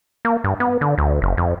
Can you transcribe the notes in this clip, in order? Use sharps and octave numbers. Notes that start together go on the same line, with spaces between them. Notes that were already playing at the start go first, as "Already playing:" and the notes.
A#3
G2
B3
D3
D2
F#1
F2